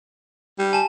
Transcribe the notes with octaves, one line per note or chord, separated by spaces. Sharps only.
G3
G#5 A5